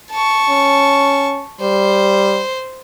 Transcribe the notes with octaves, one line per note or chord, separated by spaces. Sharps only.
A5 C#6
C#4
G3 C5